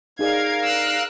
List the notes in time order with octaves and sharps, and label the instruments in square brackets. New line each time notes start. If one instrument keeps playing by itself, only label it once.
[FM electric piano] D#4 G#4 D5 [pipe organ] A#4 F5 [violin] G#6
[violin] E6 F#6